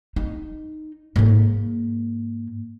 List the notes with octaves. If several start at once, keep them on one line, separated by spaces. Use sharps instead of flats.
D#4
G#2 A#3